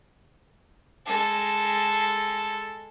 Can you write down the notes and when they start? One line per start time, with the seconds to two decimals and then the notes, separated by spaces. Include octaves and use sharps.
1.06 G#3 A4